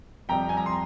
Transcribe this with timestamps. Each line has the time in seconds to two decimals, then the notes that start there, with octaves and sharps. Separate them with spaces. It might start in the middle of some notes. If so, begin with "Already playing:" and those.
0.29 F2 C3 G3 G5 A#5
0.49 G#5
0.57 A#5
0.66 C6